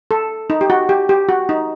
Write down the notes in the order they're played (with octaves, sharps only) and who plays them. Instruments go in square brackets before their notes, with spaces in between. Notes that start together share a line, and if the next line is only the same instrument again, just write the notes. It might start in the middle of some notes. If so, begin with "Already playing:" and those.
[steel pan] A4
D#4
G4
F#4
G4
G4
F#4
D#4